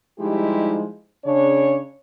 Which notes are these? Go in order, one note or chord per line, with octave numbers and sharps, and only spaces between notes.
F3 G3 G#3 D#4 E4 G4
C#3 D4 C#5